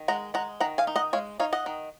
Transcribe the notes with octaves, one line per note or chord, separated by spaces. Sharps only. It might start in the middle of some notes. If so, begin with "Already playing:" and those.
Already playing: D#3
G#3 F#5 A#5
G#3 F#5 A#5
D#3 F#5 A#5
F5 G#5
D#4
D#5 F#5
G#3 C#5 F5
D#4 C#5 F5
D#5 F#5
D#3